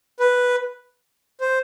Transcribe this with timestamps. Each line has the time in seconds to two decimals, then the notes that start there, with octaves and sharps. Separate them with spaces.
0.20 B4
1.41 C5